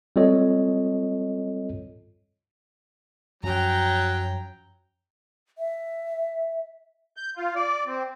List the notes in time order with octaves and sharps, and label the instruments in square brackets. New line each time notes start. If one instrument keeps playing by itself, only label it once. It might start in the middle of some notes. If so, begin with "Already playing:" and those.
[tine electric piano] G3 C4 F4 A4 C#5 D#5
[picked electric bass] F#2 F3 C#4 [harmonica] F#3 [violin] G5 A#5
[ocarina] E5
[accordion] G6
F4
D5
C4